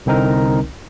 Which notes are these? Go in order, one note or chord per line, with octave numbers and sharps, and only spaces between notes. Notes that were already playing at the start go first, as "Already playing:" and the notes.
C2 D3 C4 D#4 A#4